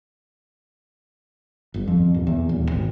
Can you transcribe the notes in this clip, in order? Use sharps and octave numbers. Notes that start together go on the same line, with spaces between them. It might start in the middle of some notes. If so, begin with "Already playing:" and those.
G1
F2
D#1
E2
D#1
G#1